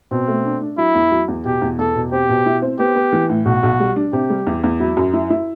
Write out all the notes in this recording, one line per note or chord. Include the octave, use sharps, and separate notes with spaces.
B2 C4
A3
D4
D4
F#3 E4
E2
F#3
E2
B2 G4
E2
E2 A4
B2
C4 G4
B2
E4
C4
B3 G4
B3
E3
A2
B1 F#4
B1
G3
D4
C3 G4
G3
E2
E2
F#3 E4
F#2
E4
E4